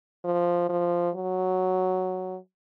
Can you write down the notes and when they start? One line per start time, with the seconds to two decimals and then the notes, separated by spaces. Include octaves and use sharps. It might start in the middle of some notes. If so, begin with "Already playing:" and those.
0.24 F3
0.69 F3
1.15 F#3